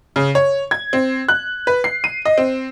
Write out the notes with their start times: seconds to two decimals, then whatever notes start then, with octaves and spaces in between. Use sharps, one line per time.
0.16 C#3
0.35 C#5
0.71 G#6
0.93 C4
1.29 F#6
1.67 B4
1.84 C7
2.04 D#7
2.26 D#5
2.38 C4